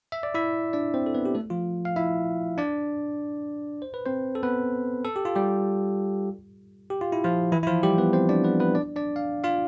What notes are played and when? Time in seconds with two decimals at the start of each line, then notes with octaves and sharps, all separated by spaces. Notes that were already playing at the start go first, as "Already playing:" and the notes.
0.12 E5
0.23 D5
0.35 E4 E5
0.73 D4 D5
0.94 C4 C5
1.06 A4
1.14 B3 B4
1.25 G4
1.35 A3 A4
1.50 F3 F4
1.85 F5
1.96 E4 E5
2.58 D4 D5
3.82 C5
3.94 B4
4.06 C4 C5
4.35 A4
4.43 B3 B4
5.04 A4
5.16 G4
5.25 F4
5.36 G3 G4
6.90 G4
7.01 F4
7.12 E4
7.24 F3 F4
7.52 E3 E4
7.63 E4
7.67 F3 F4
7.83 G3 G4
7.98 B3 B4
8.13 C4 C5
8.29 D4 D5
8.44 B3 B4
8.59 B3 B4
8.75 D4 D5
8.96 D4 D5
9.16 F5
9.44 F4 F5